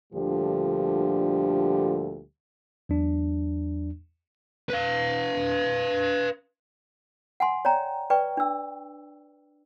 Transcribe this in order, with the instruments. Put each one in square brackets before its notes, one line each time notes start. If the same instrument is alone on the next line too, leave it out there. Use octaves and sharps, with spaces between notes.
[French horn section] D2 A#2 D3 F3 G3 G4
[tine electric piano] E2 F#3 D4
[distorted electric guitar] B4 F5
[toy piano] F#5 G#5 C6
C#5 D5 G5 A#5
B4 D5 G5 C#6
D4 E6